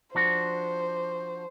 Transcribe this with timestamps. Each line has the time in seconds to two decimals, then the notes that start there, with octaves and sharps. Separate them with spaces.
0.15 F3 D4 F#4 C5